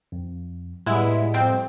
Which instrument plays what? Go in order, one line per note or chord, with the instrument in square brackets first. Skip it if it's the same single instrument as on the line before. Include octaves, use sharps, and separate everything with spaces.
[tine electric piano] F2
[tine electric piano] A2 G3 [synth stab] G#3 B3 E4
[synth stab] F2 C4 G5